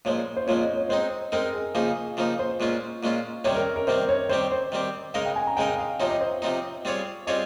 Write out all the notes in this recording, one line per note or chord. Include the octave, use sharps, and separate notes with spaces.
A#2 F3 G#3 C#5
C5
A#2 F3 G#3 C#5
D#5
C#5
G#3 C4 D#4 C5
G#3 C4 D#4 A#4
G#4
C#3 F3 A#3 D#4 G#4
C#3 F3 A#3 D#4
C5
A#2 G#3 C#4 F4
A#2 G#3 C#4 F4
C3 D#3 G3 C4 C#5
A#4
A#4
C3 D#3 G3 C4 C5
C#5
D#3 G3 C4 G4 C5
C5
D#3 G3 C4 G4
C#3 G#3 D#4 A#4 D#5 F5
G5
G#5
A#5
C#3 G#3 D#4 A#4 D#5 G5
F5
C3 F3 C4 D#4 C#5
D#5
C5
C3 F3 C4 D#4
G3 C4 F4 G#4 C#5
G3 C4 F4 G#4 C#5 D#5